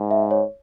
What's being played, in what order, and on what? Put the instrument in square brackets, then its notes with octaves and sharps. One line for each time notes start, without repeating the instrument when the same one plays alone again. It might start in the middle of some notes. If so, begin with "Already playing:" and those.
Already playing: [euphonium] G#2
[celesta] E5
C#5